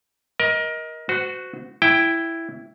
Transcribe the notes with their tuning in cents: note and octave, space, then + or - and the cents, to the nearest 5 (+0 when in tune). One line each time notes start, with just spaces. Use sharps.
A#4 +20 D#5 +20
F#4 +0 C5 -40
E4 +5 G5 +0